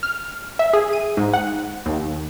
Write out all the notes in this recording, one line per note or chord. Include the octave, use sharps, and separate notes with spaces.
F6
E5
G#4
D#7
G#2
F#5
D#2